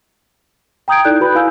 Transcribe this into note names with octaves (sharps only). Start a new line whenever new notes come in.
G5 A#5 D#6 G6 G#6 D7
D#4 E4 A4 D5 F#6 G6
F#4 B4 B5
E4 F5 G#5 E6 G6